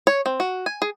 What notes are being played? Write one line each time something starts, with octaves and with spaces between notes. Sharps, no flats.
C#5
C4
F#4
G#5
G#4